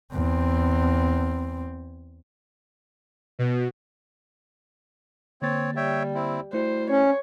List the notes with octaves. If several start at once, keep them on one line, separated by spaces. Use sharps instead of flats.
E2 C4
B2
D3 A#3 C4 C#5 A6
G3 C#5 E5 G5
C4 E4
G3 A3 E4 F#4 C5
C#4 C#5